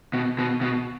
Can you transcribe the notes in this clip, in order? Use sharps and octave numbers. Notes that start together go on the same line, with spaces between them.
B2
B2
B2